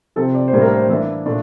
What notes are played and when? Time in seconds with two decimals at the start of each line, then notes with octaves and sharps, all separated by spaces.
0.16 C3 F3 C4 A4
0.35 D5
0.48 C5
0.53 A2 G3 A#3 D4
0.62 A#4
0.75 C5
0.89 E3 A#3 D4 E5
1.26 A#2 A3 D4